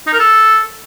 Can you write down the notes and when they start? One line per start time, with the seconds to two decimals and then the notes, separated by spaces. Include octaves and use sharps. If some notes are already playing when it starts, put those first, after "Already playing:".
0.07 D#4
0.13 A#4
0.19 A4